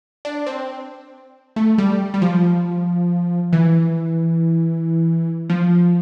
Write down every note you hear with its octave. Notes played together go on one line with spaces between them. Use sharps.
D4
C4
A3
G3
G3
F3
E3
F3